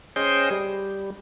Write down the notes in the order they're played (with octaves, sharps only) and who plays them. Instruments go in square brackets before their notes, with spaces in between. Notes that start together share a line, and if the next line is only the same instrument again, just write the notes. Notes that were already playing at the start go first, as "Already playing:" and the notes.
[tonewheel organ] C#4 G#4 C5 D#5 G5
G3